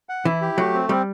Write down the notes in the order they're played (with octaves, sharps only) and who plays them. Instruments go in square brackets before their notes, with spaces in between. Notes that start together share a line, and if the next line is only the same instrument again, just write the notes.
[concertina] F#5
[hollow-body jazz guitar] E3 [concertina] E4
[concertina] G4
[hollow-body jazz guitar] F#3 [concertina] A3
[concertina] C4
[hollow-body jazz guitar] G3 [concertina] C4